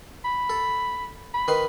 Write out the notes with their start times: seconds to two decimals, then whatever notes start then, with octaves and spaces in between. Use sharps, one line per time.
0.25 B5
0.50 A4
1.34 B5
1.48 D#3 B4 C6